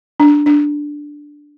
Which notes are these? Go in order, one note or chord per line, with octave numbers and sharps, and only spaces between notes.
D4
D4